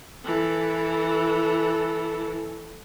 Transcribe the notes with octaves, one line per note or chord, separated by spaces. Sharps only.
E3 A4